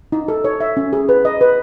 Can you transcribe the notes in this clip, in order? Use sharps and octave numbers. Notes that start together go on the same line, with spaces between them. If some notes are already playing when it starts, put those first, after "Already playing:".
D#4
A4
C#5
E5
C#4
G#4
B4
D#5
B4